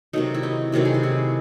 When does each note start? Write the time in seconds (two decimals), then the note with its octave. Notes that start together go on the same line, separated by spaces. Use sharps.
0.13 C3 D#3 F#3 A3 D#4
0.34 E4
0.43 D#4
0.72 C3 D#3 F#3 A3 E4
0.85 G#4
0.94 F#4
1.03 E4